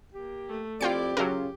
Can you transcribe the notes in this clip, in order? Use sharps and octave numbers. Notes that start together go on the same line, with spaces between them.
A#3 G4
A3
F2 E4 F4 G4 D5 G5 C#7
C#3 F#3 C#4 F4 A4 A#4